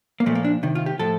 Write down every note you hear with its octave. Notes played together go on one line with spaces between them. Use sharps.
A#3
A#2 F3 A3
A#3
D4
C3 D#3
F4
G4
A2 F3 A4